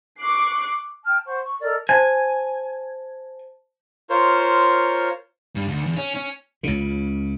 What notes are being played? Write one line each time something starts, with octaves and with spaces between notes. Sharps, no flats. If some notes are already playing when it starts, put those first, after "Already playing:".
C#6 D6 F#6 C7
G5 A5 F6
C5 F#5 C#6
C#6
A4 A#4 D5 D#5
C5 G#5 A5
F4 A#4 C5 C#5
G2
D2
E2
C#4
C#4
C#2 C#3